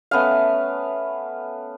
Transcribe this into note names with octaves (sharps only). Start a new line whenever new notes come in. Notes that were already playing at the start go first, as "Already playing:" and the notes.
A3 B3 C#4 F5